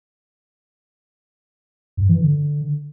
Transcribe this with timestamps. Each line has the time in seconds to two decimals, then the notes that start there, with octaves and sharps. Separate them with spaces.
1.97 G2
2.09 E3
2.20 D3